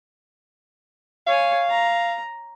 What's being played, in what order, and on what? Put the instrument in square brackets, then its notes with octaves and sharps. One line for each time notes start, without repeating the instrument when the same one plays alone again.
[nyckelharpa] C#5 G#5 [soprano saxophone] F5
[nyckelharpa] A#5